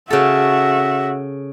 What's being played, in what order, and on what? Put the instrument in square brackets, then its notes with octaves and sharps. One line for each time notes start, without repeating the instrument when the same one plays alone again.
[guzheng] C#3 A4 [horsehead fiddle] F#4 E5